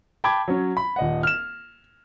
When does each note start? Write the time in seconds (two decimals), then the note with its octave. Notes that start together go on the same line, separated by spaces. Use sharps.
0.24 G5 A5 B5 D6 G#6
0.48 F#3 C#4
0.77 B5
0.96 D#1 D#5 F#5
1.23 F6 E7